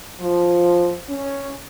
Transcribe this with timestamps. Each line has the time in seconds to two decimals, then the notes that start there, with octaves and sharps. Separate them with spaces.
0.20 F3
1.10 C#4